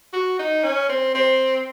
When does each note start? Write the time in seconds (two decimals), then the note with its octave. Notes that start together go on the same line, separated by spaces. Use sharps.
0.13 F#4
0.39 D#4
0.64 C#4
0.89 C4
1.15 C4